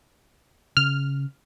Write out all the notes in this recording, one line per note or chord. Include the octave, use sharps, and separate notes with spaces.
C#3 F6